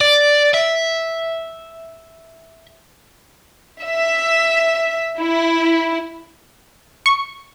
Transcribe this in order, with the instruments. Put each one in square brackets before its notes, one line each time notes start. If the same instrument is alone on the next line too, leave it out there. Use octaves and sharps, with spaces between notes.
[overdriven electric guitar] D5
E5
[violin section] E5
E4
[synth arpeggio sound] C#6